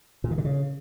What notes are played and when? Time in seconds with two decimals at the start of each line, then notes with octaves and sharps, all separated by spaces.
0.24 A#2
0.31 D#3
0.38 D3
0.45 C#3